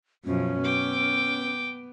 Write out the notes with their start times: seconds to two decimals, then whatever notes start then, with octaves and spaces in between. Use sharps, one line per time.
0.25 F#2 B2 F3 C#4
0.64 B3 G5 D6